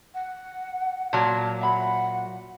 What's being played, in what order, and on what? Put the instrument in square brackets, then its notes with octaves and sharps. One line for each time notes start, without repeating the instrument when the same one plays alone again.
[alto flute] F#5
[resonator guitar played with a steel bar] A#2 F#3 [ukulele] A5
[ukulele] E5 B5 [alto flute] F#5